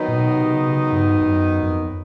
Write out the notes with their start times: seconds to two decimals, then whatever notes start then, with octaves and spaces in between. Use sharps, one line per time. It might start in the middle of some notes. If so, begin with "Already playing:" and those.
Already playing: D#3 F#3 B3 D#4
0.08 A#2
0.16 B2
0.35 C3
0.53 C#3
0.67 C3
0.74 C#3
0.92 G2
1.21 G2
1.30 F#2
1.63 F#2
1.69 F2